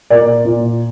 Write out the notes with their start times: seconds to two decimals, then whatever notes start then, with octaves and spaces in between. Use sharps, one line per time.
0.10 A#2 A#4 D5
0.45 A#2